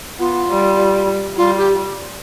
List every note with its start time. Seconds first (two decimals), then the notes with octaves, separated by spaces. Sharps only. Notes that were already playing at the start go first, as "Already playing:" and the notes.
0.19 B3 F4
0.49 G3
1.37 G3 F4
1.57 G4